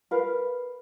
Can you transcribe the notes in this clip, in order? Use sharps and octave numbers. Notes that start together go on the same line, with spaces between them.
A#4 B4 F5